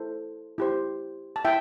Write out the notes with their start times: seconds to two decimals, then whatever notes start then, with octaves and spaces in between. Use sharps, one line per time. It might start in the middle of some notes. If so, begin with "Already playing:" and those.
Already playing: E4 A4 C5
0.58 E4 G4 C5
1.36 A5
1.45 E4 E5 G5